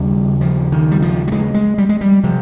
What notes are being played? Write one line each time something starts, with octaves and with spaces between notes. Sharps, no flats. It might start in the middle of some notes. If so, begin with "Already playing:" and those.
Already playing: D#2 C#3 G3
F3
D#3
G3
F3
G3
G#3
G#3
G3
G#3
G3
C3 F3